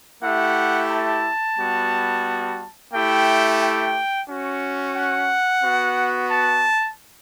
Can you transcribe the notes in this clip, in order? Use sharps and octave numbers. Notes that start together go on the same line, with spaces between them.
A3 E4 G4 F#5
A5
G3 B3 F#4
A3 E4 G4 G5
G5
C#4 F#4
F#5
B3 F#4
A5